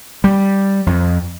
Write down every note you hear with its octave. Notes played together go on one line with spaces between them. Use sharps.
G3
F2